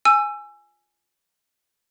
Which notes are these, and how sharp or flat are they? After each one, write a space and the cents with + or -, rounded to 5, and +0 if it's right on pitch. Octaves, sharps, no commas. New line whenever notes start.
G#5 +0 E6 +25